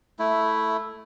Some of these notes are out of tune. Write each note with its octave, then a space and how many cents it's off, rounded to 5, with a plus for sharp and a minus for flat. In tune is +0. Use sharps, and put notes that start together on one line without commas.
A3 +0 E4 +0